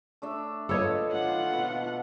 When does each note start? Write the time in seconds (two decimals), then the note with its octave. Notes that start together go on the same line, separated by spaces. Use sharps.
0.22 A3 D4 E5
0.69 F3 A4 B4 C#5 D#5 D6
1.12 F4 F#5
1.53 B2